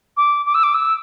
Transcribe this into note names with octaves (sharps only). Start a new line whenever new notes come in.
D6
D6
E6
D6
E6